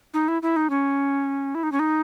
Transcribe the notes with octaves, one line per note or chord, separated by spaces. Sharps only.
D#4
E4
E4
D#4
C#4
E4
D#4
C#4
D#4